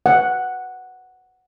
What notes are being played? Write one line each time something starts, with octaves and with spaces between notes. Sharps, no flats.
F#5